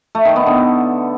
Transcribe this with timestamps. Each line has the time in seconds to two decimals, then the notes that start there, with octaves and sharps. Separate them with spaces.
0.15 A3
0.25 D#3
0.36 B3
0.46 D3